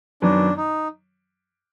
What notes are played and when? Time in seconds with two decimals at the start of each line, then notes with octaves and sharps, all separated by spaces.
0.22 F#2 D#3 F#3 B3 D4
0.57 D#4